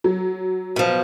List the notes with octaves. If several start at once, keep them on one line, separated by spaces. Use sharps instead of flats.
F#3
B2 F3